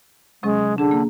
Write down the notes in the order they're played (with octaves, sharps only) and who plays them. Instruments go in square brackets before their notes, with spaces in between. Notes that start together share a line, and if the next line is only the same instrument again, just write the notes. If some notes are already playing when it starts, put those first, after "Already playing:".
[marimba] C3 F#3 C#4 [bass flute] G#3
[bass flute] D3 [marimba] D4 G#4
[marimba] A#3